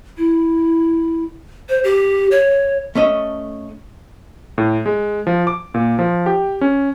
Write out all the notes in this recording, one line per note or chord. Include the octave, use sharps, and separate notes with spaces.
E4
C5
G4
C#5
A3 C#4 D#5
A2
G#3
F3
D6
A#2
F3
G4
C#4